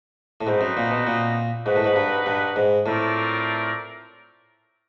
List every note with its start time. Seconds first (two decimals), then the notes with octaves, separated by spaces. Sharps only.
0.41 A2
0.46 G#2 C4 D#4 F#4 B4 D#5
0.61 F#2
0.77 A#2
0.91 B2
1.07 A#2
1.65 G#2 D#4 F#4 B4
1.76 A2
1.84 G#2
1.96 G2
2.26 G2
2.56 G#2
2.86 A2 A3 C4 F4 A#4 D5